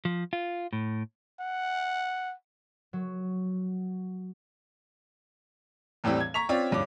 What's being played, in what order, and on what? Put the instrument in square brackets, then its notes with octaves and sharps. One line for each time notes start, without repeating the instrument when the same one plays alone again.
[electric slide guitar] F3
F4
A2
[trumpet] F#5
[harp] F#3
[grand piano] E2 A2 E3 G3 C4
G#6
A#5 C#6 B6 F7
C4 C#4 F4 C#5 D5
D1 G2 C#4 D6